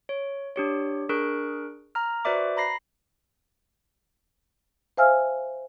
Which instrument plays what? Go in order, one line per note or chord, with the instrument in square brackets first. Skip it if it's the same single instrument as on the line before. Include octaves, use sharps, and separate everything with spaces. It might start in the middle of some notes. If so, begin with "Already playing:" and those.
[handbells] C#5
D4 G4 C#5
D4 G#4 A#4 C#6 F#6 D7
A#5 F6
F#4 B4 C5 D5 E5 D6
A#5 B5 A#6 C7
[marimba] C5 E5 F5 G#5 E6 F6